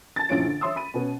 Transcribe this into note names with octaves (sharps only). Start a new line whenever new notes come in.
A5 A6
A#1 F#2 E3 F4 C#5 D7
D3
C#5 E5 C6 D#6 E6
B5 D#7
B2 B3 C#4